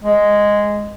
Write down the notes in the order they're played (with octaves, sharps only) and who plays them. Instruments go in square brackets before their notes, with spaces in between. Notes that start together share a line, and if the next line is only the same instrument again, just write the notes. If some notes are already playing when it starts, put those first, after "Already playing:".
[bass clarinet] G#3